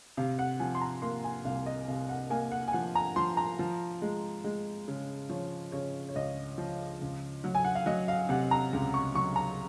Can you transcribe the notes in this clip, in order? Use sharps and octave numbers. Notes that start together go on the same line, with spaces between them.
C3 F5
F#5
F3 G#5
C6
A#5
A#3 C6
G#5
C2 F5
D#5
C3 F5
F#5
A#3 G#5
F#5
G#5
F3 F#5
A#5
F3 C6
A#5
F3
G#3
G#3
C#3
F3 C#5
C#3 C#5
C#5
C#2 D#5
F3
C#2
F#3
G#5
F#5
F5
F#3 D#5
F5
C3 F#5
A#5
C#2
C#6
F#3 C#6
A#5